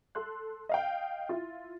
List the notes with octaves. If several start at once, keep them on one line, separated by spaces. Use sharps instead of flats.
A4 C6 F#6
D#5 F5 G5
E4 F4